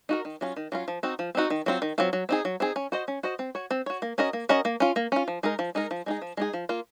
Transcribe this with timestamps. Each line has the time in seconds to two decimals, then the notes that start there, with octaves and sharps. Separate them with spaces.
0.09 D#4 F#4 A#4
0.25 D#3
0.41 F#3 C#4 F4
0.57 D#3
0.72 F#3 C#4 F4
0.88 F3
1.03 C4 D#4 F#4
1.19 F3
1.35 C4 D#4 F#4
1.50 D#3
1.66 F#3 C4 F4
1.82 D#3
1.98 F#3 C4 F4
2.13 F#3
2.29 C4 D#4 G#4
2.45 F#3
2.60 C4 D#4 G#4
2.76 C#4
2.92 F#4 C5 D#5
3.08 C#4
3.23 F#4 C5 D#5
3.39 C4
3.55 F#4 C#5
3.71 C4
3.86 F#4 C#5
4.02 A#3
4.18 C#4 F#4 A#4 D#5
4.33 A#3
4.49 C#4 F#4 A#4 D#5
4.65 A#3
4.80 C#4 F4
4.96 A#3
5.12 C#4 F4
5.28 F3
5.43 G#3 D#4 A#4
5.59 F3
5.75 G#3 D#4 A#4
5.91 F3
6.06 G#3 D#4 G#4
6.22 F3
6.37 G#3 D#4 G#4
6.53 F3
6.69 A#3 F4